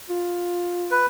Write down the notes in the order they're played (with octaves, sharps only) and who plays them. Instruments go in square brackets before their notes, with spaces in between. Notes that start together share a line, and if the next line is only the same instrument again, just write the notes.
[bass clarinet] F4
[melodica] B4